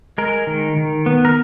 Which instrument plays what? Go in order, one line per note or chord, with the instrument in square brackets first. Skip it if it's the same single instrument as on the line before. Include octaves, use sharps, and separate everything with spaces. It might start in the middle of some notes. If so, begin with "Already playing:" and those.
[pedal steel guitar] G#3 A#4
D#3
D#3
B3
A#4